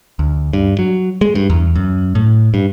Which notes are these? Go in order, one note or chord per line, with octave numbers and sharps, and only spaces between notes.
D2
G2
F#3
G#3
G2
E2
F#2
A2
G2